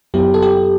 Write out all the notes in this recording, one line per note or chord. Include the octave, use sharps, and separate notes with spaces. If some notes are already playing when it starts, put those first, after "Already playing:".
F#2 F#3 B3 E4 G4
A4
G4